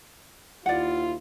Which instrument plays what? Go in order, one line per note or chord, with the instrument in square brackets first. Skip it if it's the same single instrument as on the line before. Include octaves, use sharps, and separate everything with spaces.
[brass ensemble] D#2 E4 F4 [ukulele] D5 F#5